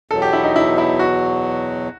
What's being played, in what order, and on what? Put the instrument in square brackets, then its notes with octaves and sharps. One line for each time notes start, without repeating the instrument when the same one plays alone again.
[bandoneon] E2 B2 F#3 [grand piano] A4
[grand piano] G4
E4
D#4
E4
E4
F#4